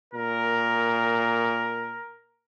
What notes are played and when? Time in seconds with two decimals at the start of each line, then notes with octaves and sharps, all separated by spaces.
0.14 A#2 A#4